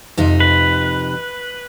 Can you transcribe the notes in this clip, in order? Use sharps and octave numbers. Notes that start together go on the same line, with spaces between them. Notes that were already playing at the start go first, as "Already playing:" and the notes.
F2 C3 D#4
B4